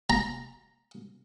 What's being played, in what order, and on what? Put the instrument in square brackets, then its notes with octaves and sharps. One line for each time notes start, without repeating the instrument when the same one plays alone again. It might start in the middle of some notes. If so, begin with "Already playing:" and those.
[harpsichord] A#5